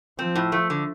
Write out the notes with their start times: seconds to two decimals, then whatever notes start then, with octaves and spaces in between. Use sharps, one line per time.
0.19 F3 C4
0.35 A2
0.52 A3
0.70 D3